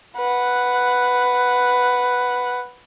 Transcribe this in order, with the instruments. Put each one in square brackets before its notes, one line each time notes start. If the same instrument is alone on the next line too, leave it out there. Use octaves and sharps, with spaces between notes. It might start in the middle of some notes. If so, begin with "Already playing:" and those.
[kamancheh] B4 F#5